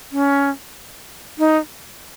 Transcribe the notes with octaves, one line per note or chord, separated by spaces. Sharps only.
C#4
D#4